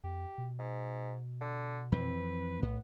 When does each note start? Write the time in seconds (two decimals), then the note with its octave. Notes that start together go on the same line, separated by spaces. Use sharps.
0.04 F2 G4
0.38 B2
0.59 G#2
1.41 D3
1.92 F2 E3 C4 B4
2.62 B1 A2 B3